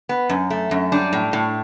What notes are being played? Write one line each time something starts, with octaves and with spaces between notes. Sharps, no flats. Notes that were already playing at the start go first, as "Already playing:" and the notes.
B3
F#2
A3
F#2
G3 D4
A2
A2